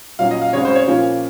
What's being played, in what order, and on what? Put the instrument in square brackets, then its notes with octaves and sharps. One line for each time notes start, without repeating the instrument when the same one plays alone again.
[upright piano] A#2 F#3 C#4 [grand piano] F5
[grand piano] D#5
F5
[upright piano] C#3 G#3 C4 F#4 [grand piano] C#5
[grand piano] C5
C#5
[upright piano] A#2 F3 A#3 C#4